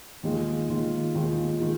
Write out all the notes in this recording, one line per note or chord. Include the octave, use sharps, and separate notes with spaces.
D#2 D#3 G#3 F4
D#2 D#3 G#3 F4
D#2 D#3 G#3 F4
D#3 G#3 F4